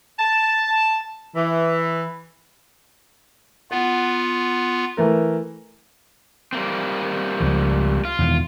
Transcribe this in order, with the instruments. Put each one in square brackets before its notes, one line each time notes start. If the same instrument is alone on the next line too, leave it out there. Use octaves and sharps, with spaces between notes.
[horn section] A5
E3
[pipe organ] B3 F4 [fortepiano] F#5
[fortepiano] E3 A3 A#4
[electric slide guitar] G3 A#3 C4
[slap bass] C#2 F3
[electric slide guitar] F4
[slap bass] E2 B2 D#3